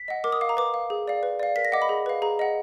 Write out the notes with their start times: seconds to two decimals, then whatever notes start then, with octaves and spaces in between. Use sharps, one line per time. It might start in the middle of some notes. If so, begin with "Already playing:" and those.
Already playing: B6
0.08 D#5 F#5
0.24 A#4 D6
0.32 D#6
0.41 F5 D6
0.49 A#5
0.57 B4 D6
0.74 F5
0.90 G#4
1.08 D5 F5
1.23 B4
1.39 D5 F5
1.56 A#4 B6
1.65 A#6
1.72 D#5 F#5 D6
1.82 B5
1.89 G#4
2.06 B4 F5
2.22 G#4 A#5
2.39 D#5 F#5